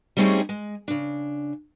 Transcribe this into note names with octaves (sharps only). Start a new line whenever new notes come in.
G3 A3 C4 C#4 D#4 G#4
G#3
C#3 D4